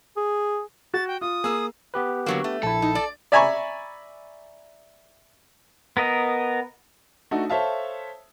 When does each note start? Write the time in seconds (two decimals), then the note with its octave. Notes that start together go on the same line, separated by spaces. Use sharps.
0.17 G#4
0.94 F#4 A6
1.08 G5
1.21 F4 D#6
1.44 A#3 G#4 E6
1.94 B3 G4 B4
2.26 D3 F#3 A#3
2.44 A3
2.63 A#1 E4 A4
2.82 D#4
2.95 D5
3.32 D5 E5 G#5 A#5 B5 C#6
5.97 B3 A#4 D#5
7.31 A3 D4 D#4 F#4
7.49 A4 C5 C#5 E5 F5 A5